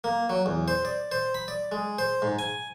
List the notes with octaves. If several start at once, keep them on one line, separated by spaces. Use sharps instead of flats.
A#3
F#3
E2
C5
D5
C5
B5
D5
G#3
C5
G#2
G#5